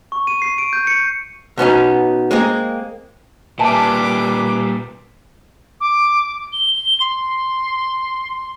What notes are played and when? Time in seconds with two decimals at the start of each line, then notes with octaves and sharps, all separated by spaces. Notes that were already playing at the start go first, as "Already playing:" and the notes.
0.12 C#6
0.27 D#7
0.42 C7
0.58 D7
0.73 G6
0.87 C#7
1.57 B2 B3 C#4 D#4
2.31 G#3 A#3 C4 G#4
3.59 A#2 G3 B4 E5 G#5 A5 D6
5.81 D6
6.53 G7
7.00 C6